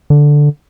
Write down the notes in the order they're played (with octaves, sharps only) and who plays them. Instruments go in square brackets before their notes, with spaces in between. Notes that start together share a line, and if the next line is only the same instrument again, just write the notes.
[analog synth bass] D3